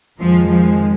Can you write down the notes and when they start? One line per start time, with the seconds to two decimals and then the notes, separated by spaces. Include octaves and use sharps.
0.20 F2 D#3 F3 G#3
0.50 F3